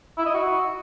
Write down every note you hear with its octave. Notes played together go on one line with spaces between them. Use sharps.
E4
D#5
F#4